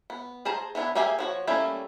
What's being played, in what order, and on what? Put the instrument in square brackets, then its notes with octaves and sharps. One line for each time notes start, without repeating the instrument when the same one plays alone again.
[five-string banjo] B3
G#4 C5 A5 A#5
E3 B3 D4 E4
A#3 G4 G#4 E5 G#5
F3 F#4 C#5
G3 A3 A#3 C#4 E4